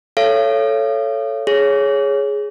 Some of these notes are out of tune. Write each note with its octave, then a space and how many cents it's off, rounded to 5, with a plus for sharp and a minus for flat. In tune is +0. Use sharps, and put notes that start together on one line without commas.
A4 +0 C#5 +0 F5 -45
G#4 +0 C#5 +0